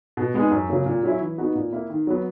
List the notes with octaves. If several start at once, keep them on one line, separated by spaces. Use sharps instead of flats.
B2
G#3 B3 D#4 G#4
F#2
C#3 F#3 A#3
A#2
F#3 C#4 E4
E3
B3 D#4 F#4
A#2
A#3 E4
D#3
F#3 B3